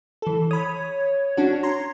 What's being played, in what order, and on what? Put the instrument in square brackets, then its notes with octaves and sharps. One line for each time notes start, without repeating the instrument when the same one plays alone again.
[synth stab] E3 A4
[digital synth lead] C#5 [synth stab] B5 D#6
[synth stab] C#4 D4 F#4
A#5 C6